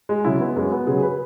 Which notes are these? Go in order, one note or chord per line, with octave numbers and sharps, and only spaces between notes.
G#3
C#3 F#3 E4
B3
F#2 G#3
B3
C#3 F#3 G#4
G#4
B4